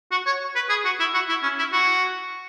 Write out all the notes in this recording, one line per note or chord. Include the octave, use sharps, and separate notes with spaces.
F#4
C#5
B4
G#4
F#4
E4
F#4
E4
C#4
E4
F#4